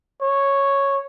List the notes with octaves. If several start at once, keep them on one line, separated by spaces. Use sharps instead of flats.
C#5